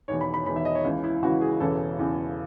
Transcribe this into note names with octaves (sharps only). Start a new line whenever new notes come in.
E1 E2 D#3 C#5
B5
B5
E1 E2 D#3 B5
E5
D#5
C#5
C#2 C#3 E3
E4
C#2 C#3 E3 F#4
G#4
E1 E2 C#3 E3 A4
E1 E2 C#3 E3